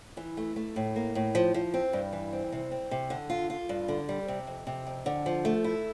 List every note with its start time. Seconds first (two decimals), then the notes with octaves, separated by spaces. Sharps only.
0.17 E3
0.37 A3
0.56 A3
0.76 A2
0.96 A#3
1.15 A2
1.35 F3
1.54 F3
1.74 C4
1.93 G2
2.13 E3
2.33 C4
2.52 C3
2.72 C4
2.91 C3
3.10 D3
3.30 F4
3.50 F4
3.69 G2
3.88 D3
4.09 G3
4.28 C3
4.47 F2
4.67 C3
4.87 F2
5.06 D3
5.26 F3
5.45 A3
5.64 E4